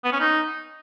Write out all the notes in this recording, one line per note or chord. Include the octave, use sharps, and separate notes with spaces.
B3
C#4
D#4